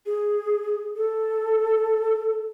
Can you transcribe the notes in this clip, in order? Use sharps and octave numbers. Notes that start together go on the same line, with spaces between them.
G#4
A4